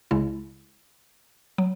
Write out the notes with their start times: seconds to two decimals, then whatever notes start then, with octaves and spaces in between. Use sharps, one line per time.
0.11 C#2 C#3 G#3 E4
1.58 F#3